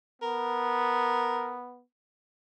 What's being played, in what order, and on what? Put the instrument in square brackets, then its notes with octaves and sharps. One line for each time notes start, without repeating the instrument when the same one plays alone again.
[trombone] B3 [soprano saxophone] A#4